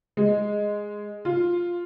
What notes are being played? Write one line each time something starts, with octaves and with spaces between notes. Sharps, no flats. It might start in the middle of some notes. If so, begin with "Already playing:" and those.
G#3
F4